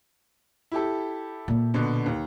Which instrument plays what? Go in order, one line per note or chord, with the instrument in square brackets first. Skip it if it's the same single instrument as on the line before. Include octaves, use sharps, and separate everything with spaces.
[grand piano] E4 G4 A4
[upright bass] A#2 A#3
[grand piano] B2 D3
D#2